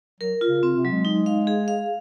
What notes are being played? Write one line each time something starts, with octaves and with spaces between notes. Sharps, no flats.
F#3 A#4
F4
C#3
C#3 C4
C3
F#3
G#3
D#4
F5
G#4
F5